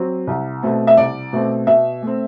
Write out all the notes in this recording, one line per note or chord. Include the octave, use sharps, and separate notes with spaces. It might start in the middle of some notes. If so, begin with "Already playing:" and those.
Already playing: F#3 C4
C2
B2 A3 C4
E5
C2 D5
B2 A3 C4
B2 E5
A3 C4